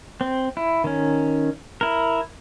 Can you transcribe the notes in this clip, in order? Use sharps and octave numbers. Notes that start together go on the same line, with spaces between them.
C4
E4
D#3 C#4
E4 A#4